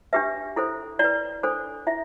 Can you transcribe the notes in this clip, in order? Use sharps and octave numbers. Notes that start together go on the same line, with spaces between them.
D4 G4 B4 E5
E4 A4 C5
E4 B4 D5
D4 A4 C5
E4 E5